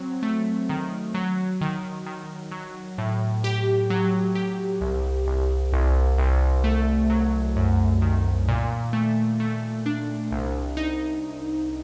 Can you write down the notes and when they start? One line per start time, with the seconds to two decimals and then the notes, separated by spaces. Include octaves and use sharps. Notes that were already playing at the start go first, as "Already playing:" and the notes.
Already playing: F#3 C4
0.23 A3
0.69 D#3
1.14 F#3
1.61 D#3
2.06 D#3
2.52 F#3
2.98 A2
3.44 G4
3.90 F#3
4.35 G4
4.81 C2
5.27 C2
5.73 C2
6.18 C2
6.64 A3
7.10 F#3
7.56 F#2
8.02 D#3
8.48 A#2
8.93 A3
9.40 A3
9.86 D4
10.31 C2
10.77 D#4